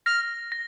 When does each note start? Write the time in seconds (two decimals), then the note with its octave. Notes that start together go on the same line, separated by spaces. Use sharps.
0.06 F6 A#6
0.52 A#6